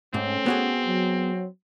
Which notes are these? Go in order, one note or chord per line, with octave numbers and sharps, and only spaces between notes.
G#2 A3 C4 C#4
B3 F#4 G#4
F#3